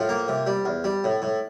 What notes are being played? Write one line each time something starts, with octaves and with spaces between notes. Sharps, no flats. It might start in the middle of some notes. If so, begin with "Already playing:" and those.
Already playing: A2 F3 F4
A#3
C3
G3
E2
G3
A2
A2